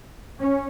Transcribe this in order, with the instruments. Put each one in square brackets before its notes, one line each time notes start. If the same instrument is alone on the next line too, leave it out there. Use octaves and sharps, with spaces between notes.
[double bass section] C#4